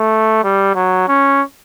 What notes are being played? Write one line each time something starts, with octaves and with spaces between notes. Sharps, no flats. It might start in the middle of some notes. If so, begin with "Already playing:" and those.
Already playing: A3
G3
F#3
C#4